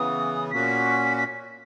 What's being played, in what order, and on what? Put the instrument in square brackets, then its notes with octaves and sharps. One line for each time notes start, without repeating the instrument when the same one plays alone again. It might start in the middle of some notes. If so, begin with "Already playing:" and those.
Already playing: [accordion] C#3 E3 B3 [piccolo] D#6
[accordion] A#2 A#3 C#4 F#4 [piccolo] B6
[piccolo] B6